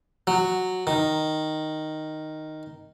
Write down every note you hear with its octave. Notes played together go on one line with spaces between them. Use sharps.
F#3
D#3